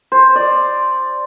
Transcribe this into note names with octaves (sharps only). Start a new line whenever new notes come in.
C5
D5